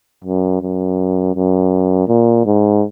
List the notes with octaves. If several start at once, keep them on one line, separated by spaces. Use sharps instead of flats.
F#2
F#2
F#2
A#2
G#2